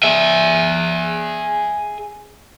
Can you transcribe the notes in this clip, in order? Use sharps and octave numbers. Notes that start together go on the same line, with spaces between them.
G#4 E5